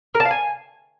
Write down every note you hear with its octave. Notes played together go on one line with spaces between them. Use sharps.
A#4
A5
F5
G#5